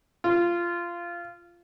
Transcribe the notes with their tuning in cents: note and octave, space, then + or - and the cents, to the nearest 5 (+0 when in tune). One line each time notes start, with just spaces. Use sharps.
F4 -15